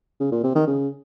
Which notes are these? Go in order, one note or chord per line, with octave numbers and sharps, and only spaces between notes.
C#3
A#2
C3
D#3
C#3